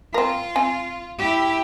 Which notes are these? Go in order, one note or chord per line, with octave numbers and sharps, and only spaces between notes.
C4 F4 A#4
C4 G#5
E4 G4